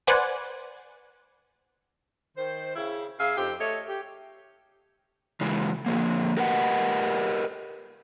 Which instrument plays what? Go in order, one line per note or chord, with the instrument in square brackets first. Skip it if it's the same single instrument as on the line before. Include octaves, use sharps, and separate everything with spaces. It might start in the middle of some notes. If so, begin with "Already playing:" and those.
[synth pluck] B4 C5 D5 F#5 G#5
[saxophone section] D#3 C5
C#3 E4
C#3 G#4 E5 F5
F2 C4 D#4 G4
A3 C#5 D#5
G4
[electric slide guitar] C#3 E3 G#3
D3 F3 A#3
G4 A#4 B4 D#5 F#5